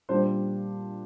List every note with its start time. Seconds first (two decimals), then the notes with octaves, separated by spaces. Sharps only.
0.09 A#2 G3 D4 C5